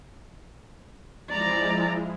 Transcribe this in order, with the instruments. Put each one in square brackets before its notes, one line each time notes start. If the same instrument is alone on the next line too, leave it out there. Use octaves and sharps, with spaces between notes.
[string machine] F3 G#3 E4 [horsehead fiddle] D5 A#5